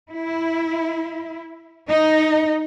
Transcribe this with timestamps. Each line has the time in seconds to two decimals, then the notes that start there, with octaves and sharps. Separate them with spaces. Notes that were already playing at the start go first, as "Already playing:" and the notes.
0.11 E4
1.88 D#4